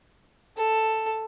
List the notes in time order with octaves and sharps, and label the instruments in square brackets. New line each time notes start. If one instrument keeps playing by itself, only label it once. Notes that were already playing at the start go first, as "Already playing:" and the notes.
[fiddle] A4